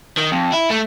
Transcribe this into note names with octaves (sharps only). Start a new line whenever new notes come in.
D#3
F2
E4
A3